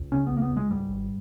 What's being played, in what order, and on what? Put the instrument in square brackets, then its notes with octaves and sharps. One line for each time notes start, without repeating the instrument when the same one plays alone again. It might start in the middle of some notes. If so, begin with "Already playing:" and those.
Already playing: [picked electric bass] C#2
C#3 C#4
B3
C#2 A#3
B3
C#2
G#3
G#2 G3
G#1